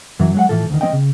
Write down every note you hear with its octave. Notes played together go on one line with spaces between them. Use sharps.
F#2 E3 F#3
F#3 G#3 F#5
A2 E3 F3 A4
D2 D#3
F3 C4 D#5 G5
C#3